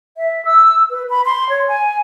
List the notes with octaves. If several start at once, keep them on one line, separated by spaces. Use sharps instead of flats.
E5
E6
B4
B5
C6
C#5
G#5